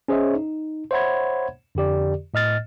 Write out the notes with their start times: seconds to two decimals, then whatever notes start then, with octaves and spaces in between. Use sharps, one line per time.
0.08 C#4 G#4 C5 C#5 D#5 E5
0.34 D#4
0.91 C5 C#5 E5 F#5 B5 G#6
1.75 F2 D3 G4 D5
2.34 A2 D#5 F6 A6